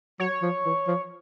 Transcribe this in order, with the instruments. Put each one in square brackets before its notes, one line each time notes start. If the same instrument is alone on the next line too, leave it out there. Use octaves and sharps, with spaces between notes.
[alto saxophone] F#3 [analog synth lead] C#5
[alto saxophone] F3
E3
F3